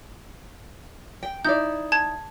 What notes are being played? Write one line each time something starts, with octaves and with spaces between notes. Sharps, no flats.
G5
D#4 E4 D5 G6
A5 G#6